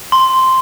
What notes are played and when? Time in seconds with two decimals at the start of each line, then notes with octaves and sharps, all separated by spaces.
0.12 C6